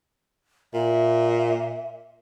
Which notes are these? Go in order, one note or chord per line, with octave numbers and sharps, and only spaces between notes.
A#2 E5